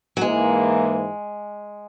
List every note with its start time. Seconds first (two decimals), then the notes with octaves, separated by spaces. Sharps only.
0.17 F#3
0.21 G#2 E3 G#3 A#3